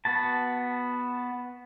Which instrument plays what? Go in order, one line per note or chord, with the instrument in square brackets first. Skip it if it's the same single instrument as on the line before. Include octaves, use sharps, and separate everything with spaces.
[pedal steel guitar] B3 F#4 A5